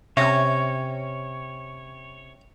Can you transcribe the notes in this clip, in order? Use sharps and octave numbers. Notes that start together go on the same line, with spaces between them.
C3 C#4 G4 C#5 E5